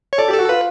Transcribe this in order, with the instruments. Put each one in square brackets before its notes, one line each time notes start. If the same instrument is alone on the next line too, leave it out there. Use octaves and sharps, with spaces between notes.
[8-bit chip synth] C#5
[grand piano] A4 [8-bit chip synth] D5
[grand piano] G4
[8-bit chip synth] A4
[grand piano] F#4
[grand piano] F4 [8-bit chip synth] B4